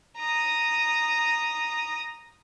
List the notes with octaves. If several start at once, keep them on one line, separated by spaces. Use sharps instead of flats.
A#5 D#6